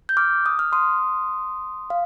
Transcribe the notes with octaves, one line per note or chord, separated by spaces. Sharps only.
G6
D6 F6
D#6
F6
C6 D#6
F5